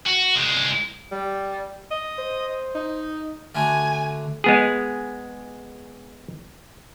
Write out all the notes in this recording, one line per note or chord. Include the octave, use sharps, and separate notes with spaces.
F#4
C2 G#3
G3
D#5
C5
D#4
D3 A3 F#4 G#5
G#3 B3 G#4